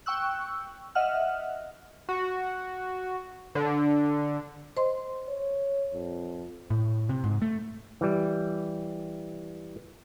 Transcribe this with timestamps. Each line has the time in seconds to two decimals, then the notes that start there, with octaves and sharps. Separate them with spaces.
0.06 G5 C#6 E6 F#6
0.95 D#5 E5 F#5 F6
2.09 F#4
3.55 D3
4.77 C5 D#5 C6
5.28 C#5
5.93 F2
6.70 A2
7.09 C3
7.24 G#2
7.42 A3
8.01 E3 G3